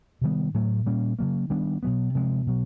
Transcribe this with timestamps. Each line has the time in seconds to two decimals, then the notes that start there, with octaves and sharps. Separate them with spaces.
0.21 C3 D#3 G3 B3
0.54 A2 F#3 A3
0.86 A#2 G3 A#3 C#4
1.19 C#3 F#3 A#3
1.50 D#3 G3 B3 D4
1.83 B2 F#3 B3
2.15 C3 F3 G#3
2.47 B2 F#3